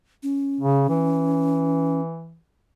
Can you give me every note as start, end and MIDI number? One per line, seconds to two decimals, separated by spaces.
0.23 2.01 61
0.61 0.89 49
0.89 2.38 52